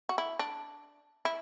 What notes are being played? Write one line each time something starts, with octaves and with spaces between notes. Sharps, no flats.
F#4
E4
D4
E4